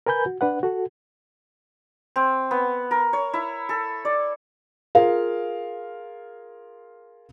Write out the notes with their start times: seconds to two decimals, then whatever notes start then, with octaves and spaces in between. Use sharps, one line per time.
0.06 A#4 B4 G#5 B5 G6
0.26 F#4
0.41 D4 B4 F#5
0.63 F#4 A4
2.16 C4
2.51 B3
2.91 A#4
3.13 C#5
3.34 E4
3.69 A4
4.05 D5
4.95 F4 G#4 A#4 F5